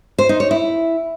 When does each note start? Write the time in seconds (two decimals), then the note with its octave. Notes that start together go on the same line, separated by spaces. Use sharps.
0.18 C5
0.29 D#4
0.40 C#5
0.51 E4